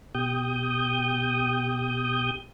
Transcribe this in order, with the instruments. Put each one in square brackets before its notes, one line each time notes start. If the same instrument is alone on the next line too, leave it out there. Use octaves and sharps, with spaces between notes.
[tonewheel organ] B2 G4 D#6 G6